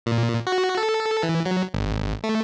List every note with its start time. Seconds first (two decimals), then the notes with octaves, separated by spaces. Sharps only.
0.06 A#2
0.47 F#4
0.77 A4
1.23 E3
1.45 F#3
1.74 G#1
2.24 A3